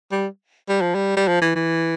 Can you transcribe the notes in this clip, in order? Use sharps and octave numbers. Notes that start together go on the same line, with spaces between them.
G3
G3
F3
G3
G3
F3
E3
E3